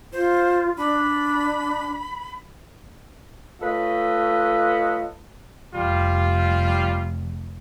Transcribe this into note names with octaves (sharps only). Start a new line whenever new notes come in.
F4 C5
D4 B5
A3 F4 A4 B4 C#5 D#5
F1 G3 F4